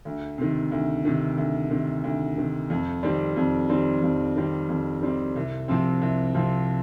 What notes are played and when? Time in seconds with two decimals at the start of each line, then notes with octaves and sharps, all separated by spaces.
0.05 D2
0.38 C3 D#3
0.72 D2
1.05 C3 D#3
1.38 D2
1.70 C3 D#3
2.04 D2
2.37 C3 D#3
2.70 F2
3.03 D#3 G3 C4
3.36 F2
3.69 D#3 G3 C4
4.03 F2
4.36 D#3 G3 C4
4.69 F2
5.01 D#3 G3 C4
5.36 C2
5.68 C3 F3 C4
6.02 C2
6.34 C3 F3 C4